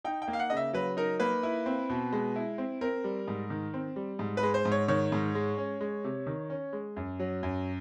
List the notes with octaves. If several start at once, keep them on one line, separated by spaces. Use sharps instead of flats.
D#4 G5
G5
A#3
F5
F#5
C#3 D#5
E5
F#3 B4
D#4 A#4
A#3 B4
E4
C4
B2
G#3
E4
C4
C4 A#4
G3
G#2
D#3
C4
G3
G#2
B4
G#3
C5
G#2
C#5
D#3 C#5
G#2
G#3
C#4
G#3
C3
D#3
C#4
G#3
F#2
F#3
F#2